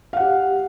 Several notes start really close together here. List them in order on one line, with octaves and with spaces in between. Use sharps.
F5 F#5 G4